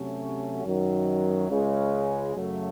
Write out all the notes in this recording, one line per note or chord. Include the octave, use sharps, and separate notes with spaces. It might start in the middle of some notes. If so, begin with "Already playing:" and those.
Already playing: C3 F#3 A3 C#4
F#2 D#3 F#3
C#2 C#3 G#3
F#2 C#3 F#3 A3